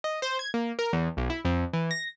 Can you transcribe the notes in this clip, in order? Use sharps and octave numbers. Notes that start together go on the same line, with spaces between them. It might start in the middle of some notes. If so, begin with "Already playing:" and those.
D#5
C5
G#6
A#3
A#4
E2
B1
E4
F2
E3
A#6